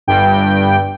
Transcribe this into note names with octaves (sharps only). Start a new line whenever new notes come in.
G1 G2 G5